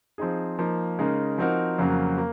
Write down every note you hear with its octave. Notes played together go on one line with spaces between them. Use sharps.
F3 C4 D#4 G#4
F3 A#3 D#4
C#3 G#3 D#4 A#4
F3 C4 D#4 F#4 A#4
F2 C#3 F#3 A#3
A#3